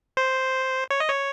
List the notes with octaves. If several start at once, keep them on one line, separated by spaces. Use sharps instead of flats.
C5
C#5
D#5
C#5